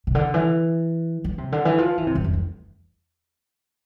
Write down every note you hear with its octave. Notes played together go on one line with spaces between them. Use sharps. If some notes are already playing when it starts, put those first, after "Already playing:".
C3
D3
E3
F3
C3
D3
E3
F3
E3
C3
E2
F2
E3